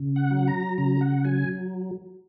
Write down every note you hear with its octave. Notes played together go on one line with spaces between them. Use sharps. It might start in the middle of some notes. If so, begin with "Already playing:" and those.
Already playing: C#3
F#5
F#3
A#5
C#3 A#5
F#5
F#3 G#5